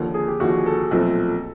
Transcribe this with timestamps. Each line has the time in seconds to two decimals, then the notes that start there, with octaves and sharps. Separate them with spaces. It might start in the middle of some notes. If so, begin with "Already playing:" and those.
Already playing: D#2 D3 F3
0.14 G#4
0.28 G4
0.40 D#2 D3 F3 F#4
0.66 A4
0.91 B1 A#2 F3 A3 C4 A4